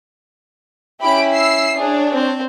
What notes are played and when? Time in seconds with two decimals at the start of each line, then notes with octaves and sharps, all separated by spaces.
1.00 C#4 E4 G4 B5 D7
1.32 E6 C7
1.77 D4 G#4 C#5
2.13 C4 C5